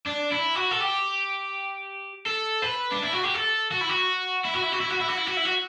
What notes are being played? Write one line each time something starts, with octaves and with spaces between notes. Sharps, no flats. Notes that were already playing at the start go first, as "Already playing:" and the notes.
D4
E4
F#4
A4
G4
A4
B4
D4
E4
F#4
G4
A4
F#4
E4
F#4
E4
F#4
E4
F#4
E4
F#4
E4
F#4
E4
F#4
E4
F#4